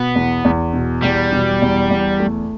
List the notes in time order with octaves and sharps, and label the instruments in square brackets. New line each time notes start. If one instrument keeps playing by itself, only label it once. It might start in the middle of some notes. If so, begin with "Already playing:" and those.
Already playing: [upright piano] B2 [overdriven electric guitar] B3
[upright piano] E2
E2
B2
[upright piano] E2 [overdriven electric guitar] G3
[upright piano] B2
E2
E2
A3